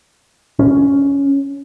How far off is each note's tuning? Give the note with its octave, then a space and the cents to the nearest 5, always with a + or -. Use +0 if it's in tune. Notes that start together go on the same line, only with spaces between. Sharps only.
C#4 +10